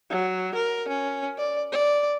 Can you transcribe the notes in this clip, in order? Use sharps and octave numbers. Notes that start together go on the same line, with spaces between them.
F#3
A#4
C#4
D5
D5